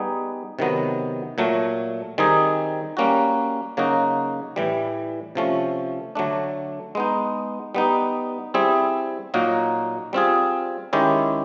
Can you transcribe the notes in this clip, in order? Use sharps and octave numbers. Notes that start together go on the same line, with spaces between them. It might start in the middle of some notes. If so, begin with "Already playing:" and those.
Already playing: G3 B3 D#4 G#4
C3 D#3 F#3 B3
A#2 F#3 A3
D#3 G3 C4 D#4 G#4
G3 A#3 C#4 F#4
C#3 F#3 A#3 D#4 F#4
A2 E3 G3
C3 F3 A3 C#4
D3 F#3 A3 D4
G#3 B3 D#4
G3 B3 D#4
G3 C4 E4 G#4
A#2 F#3 A#3 D#4 F#4
G3 C4 F4 G#4
D#3 G#3 C#4 E4 G4